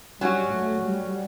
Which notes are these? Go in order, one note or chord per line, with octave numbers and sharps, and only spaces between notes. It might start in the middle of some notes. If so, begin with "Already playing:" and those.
F#3 G3 C#4 F#4
A3
G3